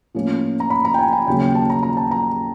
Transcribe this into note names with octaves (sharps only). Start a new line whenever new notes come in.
A2 F3 A#3 C#4
A#5
B5
A#5
G5
G#5
G#5
D#2 C#3 F#3 A#3 G5
G5
A5
A#5
A#5
A5
A#5